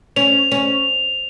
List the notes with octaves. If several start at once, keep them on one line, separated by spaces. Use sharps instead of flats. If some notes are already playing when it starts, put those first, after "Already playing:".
C#4 F7
C#4